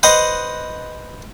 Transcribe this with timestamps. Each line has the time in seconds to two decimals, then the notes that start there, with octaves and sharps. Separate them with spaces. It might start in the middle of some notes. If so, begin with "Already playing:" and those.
0.03 B4 C5 D#5 F#5